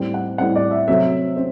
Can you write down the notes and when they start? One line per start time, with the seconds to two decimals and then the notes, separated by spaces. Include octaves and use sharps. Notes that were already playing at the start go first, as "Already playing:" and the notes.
Already playing: A2 G3 C4
0.14 F#5
0.38 A2 G3 C4 F#5
0.56 D5
0.71 E5
0.88 C3 F#3 A3 C4 E5
1.37 C4